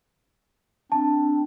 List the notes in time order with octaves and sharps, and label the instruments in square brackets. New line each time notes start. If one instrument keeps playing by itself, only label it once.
[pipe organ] C4 D4 [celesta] A5